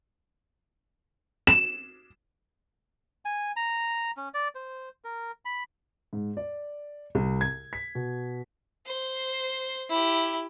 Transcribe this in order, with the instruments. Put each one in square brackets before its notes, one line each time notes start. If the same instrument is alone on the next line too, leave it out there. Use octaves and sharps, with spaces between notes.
[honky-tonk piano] E7
[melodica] G#5
A#5
C#4
D5
C5
A#4
B5
[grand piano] G#2
D5
C2
G#6
B6
B2
[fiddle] C5
E4 G4